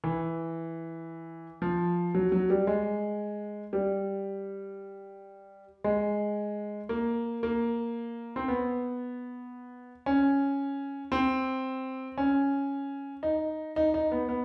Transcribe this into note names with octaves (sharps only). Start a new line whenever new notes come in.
E3
F3
F#3
F#3
G3
G#3
G3
G#3
A#3
A#3
C4
B3
C#4
C4
C#4
D#4
D#4
D#4
B3
B3